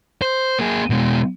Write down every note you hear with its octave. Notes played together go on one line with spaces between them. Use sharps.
C5
A#3 G#4
B2 G#3